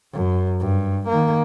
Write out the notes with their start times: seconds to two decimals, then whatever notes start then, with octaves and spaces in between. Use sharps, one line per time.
0.13 F#2
0.60 G2
1.09 D#3 A#3